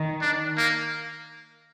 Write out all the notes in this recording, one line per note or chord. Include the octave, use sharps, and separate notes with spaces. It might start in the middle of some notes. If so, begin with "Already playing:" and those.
Already playing: D#3
D4
A#3